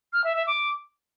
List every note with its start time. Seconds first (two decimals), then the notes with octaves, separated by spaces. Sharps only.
0.13 F6
0.24 E5
0.35 E5
0.47 D6